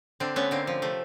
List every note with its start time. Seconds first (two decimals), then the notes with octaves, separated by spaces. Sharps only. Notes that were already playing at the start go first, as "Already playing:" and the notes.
0.20 D3 C4 D4
0.36 A3 B3 C#4
0.51 D3 A#3 C4
0.67 F3
0.82 C3 A3